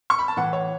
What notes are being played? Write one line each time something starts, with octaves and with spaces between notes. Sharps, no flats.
C#6
B5
A5
A2 E3 F#5
C#5